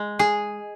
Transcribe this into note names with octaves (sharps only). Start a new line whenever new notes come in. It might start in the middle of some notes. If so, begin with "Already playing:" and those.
Already playing: G#3
G#4